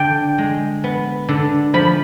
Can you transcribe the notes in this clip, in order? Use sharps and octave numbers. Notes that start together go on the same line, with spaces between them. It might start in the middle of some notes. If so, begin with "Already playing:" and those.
Already playing: D3 G5
G#3
B3
D3
F3 B5